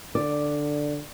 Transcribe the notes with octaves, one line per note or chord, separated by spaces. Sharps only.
D3 D5